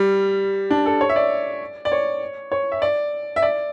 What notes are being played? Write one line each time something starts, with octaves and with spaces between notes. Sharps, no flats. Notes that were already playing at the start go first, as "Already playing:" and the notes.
Already playing: G3
D4
A4
C#5
E5
D5
D5
C#5
C#5
E5
D5
E5
D5